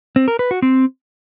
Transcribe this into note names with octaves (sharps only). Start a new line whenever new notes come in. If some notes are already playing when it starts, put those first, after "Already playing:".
C4
A#4
B4
F#4
C4